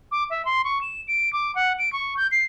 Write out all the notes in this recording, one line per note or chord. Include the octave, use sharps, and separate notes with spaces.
D6
E5
C6
C#6
E7
D7
D6
F#5
D7
C#6
G6
C7